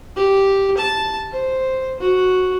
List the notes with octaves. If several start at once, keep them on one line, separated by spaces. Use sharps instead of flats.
G4
A5
C5
F#4